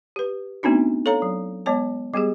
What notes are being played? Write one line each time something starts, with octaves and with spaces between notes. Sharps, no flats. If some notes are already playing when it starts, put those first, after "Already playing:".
G4 B4
A3 B3 C4 D4 D#4 F#4
A4 C#5 F5 A#5
F#3
G#3 B3 C#5 A5
G3 B3 G4 G#4